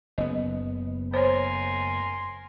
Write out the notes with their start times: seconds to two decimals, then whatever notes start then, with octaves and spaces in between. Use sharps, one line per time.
0.18 F#1 B3 D#5
1.14 A#4 C5 C#5 G#5 C6